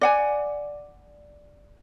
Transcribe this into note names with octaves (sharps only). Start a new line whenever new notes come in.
D5 F#5 G#5